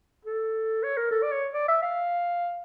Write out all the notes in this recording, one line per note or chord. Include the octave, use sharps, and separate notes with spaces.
A4
C#5
A#4
A4
D5
C#5
D5
E5
F5